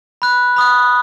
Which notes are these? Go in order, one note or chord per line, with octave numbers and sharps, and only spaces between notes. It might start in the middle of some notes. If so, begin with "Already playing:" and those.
B5 F#6
B5 D#6 F#6